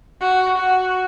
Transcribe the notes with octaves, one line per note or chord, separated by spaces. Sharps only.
F#4
F#4